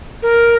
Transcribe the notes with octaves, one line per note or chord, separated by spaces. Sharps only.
A#4